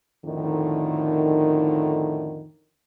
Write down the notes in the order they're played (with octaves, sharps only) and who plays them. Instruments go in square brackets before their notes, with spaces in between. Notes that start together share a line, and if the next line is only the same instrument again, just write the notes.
[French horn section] F2 A2 D3 D#3